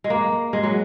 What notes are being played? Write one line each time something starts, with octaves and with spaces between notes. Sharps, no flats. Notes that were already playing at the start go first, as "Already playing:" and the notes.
G#3
A#3
G#3
F#3